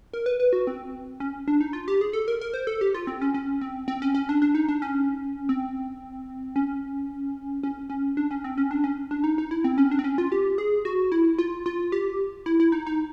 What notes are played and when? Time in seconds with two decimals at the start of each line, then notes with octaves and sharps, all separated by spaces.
0.13 A#4
0.26 B4
0.40 B4
0.53 F#4
0.67 C4
1.20 C#4
1.48 D4
1.61 D#4
1.73 F4
1.88 G4
2.01 G#4
2.13 A4
2.28 A#4
2.41 A#4
2.54 C5
2.67 A4
2.81 G4
2.94 F4
3.07 C4
3.22 C#4
3.34 C#4
3.61 C4
3.88 C4
4.02 C#4
4.15 C#4
4.29 D4
4.42 D4
4.55 D#4
4.68 D4
4.82 C#4
5.49 C4
6.56 C#4
7.63 C#4
7.90 C#4
8.17 D4
8.31 C#4
8.44 C4
8.58 C#4
8.71 D4
8.84 C#4
9.11 D4
9.24 D#4
9.38 D#4
9.51 E4
9.64 C4
9.78 C#4
9.91 D4
9.99 C4
10.04 C#4
10.18 F4
10.32 G4
10.58 G#4
10.85 F#4
11.12 E4
11.38 F4
11.66 F4
11.92 G4
12.46 E4
12.60 E4
12.72 D#4
12.87 D#4